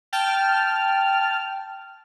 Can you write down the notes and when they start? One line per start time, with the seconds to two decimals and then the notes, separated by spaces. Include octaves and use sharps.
0.13 G5 A5 F6